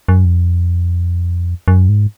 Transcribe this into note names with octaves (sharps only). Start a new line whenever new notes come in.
F#2
F2
F#2
G#2